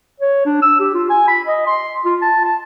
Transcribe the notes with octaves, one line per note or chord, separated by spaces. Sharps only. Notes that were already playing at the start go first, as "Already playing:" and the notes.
C#5
D4
E6
G4
F4
G#5
B5
D#5
C6
F4
A5
A5